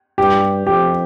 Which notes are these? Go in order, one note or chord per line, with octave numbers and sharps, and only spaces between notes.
G2 G4
F2 G4